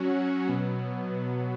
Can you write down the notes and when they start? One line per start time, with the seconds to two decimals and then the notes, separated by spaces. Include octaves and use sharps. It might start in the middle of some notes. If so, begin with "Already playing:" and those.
Already playing: F#3 C#4 F#4
0.48 B2 F#3 B3